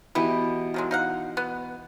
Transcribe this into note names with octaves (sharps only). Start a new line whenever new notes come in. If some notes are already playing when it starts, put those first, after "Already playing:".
B2 E3 B3 G4
D#3 F#3 G#3
D#4 F5 F#5
B3